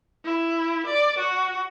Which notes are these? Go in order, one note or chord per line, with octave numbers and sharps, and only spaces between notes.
E4
D5
F#4